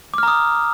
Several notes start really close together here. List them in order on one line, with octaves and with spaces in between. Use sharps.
D6 F6 A#5 D#6